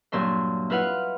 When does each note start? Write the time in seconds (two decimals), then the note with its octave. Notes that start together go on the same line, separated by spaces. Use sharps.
0.12 G2 A#2 F#3 E5 C6
0.70 E4 F4 B4 F5 F#5